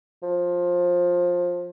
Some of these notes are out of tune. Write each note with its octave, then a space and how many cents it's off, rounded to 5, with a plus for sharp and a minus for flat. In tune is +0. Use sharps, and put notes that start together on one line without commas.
F3 +15